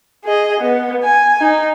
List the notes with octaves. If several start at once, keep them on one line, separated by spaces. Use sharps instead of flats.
G#4 D#5
B3
G#5
D#4